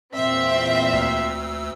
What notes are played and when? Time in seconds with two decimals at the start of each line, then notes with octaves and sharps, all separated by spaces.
0.16 E2 A#2 C4 E5 F5
0.93 D2 E6